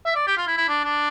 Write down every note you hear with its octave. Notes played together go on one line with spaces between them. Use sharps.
E5
D5
G4
F4
E4
E4
D4
D4